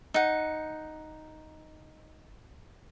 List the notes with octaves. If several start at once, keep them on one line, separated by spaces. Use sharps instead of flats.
D#4 F#5